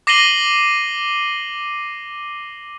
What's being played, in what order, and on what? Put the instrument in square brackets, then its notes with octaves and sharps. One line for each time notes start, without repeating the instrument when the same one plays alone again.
[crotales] D6 A#6 C7 D#7 F#7 G7